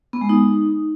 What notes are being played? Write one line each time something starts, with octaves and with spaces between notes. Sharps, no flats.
B3
G#3
D#4